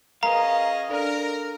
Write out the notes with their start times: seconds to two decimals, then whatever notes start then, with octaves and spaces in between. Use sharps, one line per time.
0.23 C#4 G#4 A#4 B4 D#5 F5 A#5
0.89 D4 A4 A#4 D5